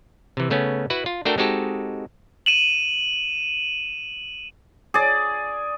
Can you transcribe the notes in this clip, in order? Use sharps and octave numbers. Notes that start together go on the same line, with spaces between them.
C3 E3
C#3 A3 B3 C#4
E4 F#4 B4 F#5
F4
A3 D4 F#4 A4 A#4 G5
G#3 C4 D#4 F#4 G4 A4
D#7 E7 F#7
G#4 D5